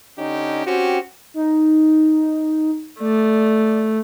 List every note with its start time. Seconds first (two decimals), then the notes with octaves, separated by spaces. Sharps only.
0.19 D3 C#4 D#4 G4
0.66 C4 C#4 F#4 G4
1.34 D#4
3.00 A3 D5